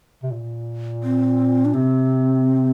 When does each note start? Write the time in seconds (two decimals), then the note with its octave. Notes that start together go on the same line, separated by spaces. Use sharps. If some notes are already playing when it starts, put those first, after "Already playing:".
0.23 C3
0.32 A#2
1.03 C4
1.65 D4
1.74 C3 C4